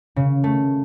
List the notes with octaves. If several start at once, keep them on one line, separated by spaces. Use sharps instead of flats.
C#3
A3